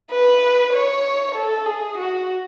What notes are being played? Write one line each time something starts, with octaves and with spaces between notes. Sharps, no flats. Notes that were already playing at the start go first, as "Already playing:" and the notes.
B4
C#5
A4
G#4
F#4